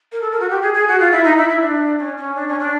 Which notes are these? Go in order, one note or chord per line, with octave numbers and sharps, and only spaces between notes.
A#4
A4
A#4
F#4
G4
G#4
G#4
F#4
F4
E4
D#4
E4
E4
D4
C#4
C#4
D4
C#4
D4